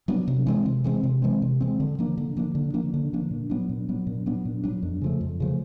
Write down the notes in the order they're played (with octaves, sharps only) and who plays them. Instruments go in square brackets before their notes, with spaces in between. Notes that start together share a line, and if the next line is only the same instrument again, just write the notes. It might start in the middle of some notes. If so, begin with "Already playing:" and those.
[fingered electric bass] F#3 B3 D4
C3
E3 G#3 C4
C3
E3 G#3 C4
C3
E3 G#3 C4
C3
E3 G#3 C4
D3
F3 A#3 D4
D3
F3 A#3 D4
D3
F3 A#3 D4
D3
F3 A#3 D4
A#2
F#3 B3 D4
A#2
F#3 B3 D4
A#2
F#3 B3 D4
A#2
F#3 B3 D4
F2
C#3 F3 A3
F2
C#3 F3 A3